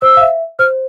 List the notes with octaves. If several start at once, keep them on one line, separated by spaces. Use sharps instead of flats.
C5 E6
F5
E5
C5 F6